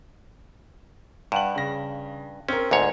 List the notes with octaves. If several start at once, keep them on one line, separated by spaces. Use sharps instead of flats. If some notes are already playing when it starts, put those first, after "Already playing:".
G2 F#5 F#7
C#3 A#6
C4 C#4 A#4
D2 G#2 C#5